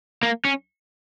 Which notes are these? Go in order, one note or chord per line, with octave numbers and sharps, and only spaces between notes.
A#3
C#4